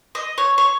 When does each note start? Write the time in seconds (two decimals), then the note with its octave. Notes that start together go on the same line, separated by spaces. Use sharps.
0.15 D#5
0.38 C#5
0.58 C#5